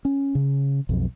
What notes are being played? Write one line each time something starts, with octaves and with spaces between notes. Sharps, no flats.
C#4
C#3
B1 F2